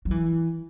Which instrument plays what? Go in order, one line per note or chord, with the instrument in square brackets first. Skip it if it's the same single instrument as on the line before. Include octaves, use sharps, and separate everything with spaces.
[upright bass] F#3
E3